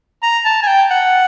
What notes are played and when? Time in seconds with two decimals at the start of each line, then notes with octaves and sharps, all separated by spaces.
0.23 A#5
0.45 A5
0.63 G#5
0.67 G5
0.90 F#5